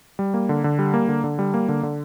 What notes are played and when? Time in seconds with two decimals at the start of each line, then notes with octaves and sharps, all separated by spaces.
0.19 G3
0.34 A#3
0.49 D3
0.64 D3
0.79 G3
0.94 A#3
1.08 D3
1.24 D3
1.39 G3
1.54 A#3
1.69 D3
1.83 D3